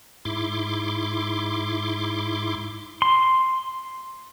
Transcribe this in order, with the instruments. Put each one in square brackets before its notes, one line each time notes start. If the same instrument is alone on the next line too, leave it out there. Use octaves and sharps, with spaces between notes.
[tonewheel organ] G#2 E4 C6 D6
[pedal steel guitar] C6